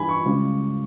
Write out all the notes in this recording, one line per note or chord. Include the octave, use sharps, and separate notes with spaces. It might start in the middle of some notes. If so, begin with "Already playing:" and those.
Already playing: G2 E3 G3 G#5 B5
C#6
C#2 C#3 G3